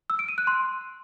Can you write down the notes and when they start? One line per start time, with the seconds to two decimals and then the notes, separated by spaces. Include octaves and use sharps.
0.10 E6
0.19 D7
0.28 D#7
0.38 F#6
0.47 C6